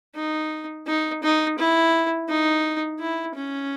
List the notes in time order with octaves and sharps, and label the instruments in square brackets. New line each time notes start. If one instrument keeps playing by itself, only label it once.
[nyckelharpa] D#4
D#4
D#4
E4
D#4
E4
C#4